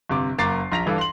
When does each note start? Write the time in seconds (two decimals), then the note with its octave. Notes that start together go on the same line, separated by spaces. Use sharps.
0.09 G1 C3 D6
0.38 F#1 A#3 A#5 D6 A6 C7
0.72 A#1 A#5 A#6 B6 F7
0.86 G2 E3 D4 A4 F5
0.98 C6 F#7